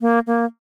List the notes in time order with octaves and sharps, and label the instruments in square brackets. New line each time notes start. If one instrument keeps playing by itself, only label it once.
[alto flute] A#3
A#3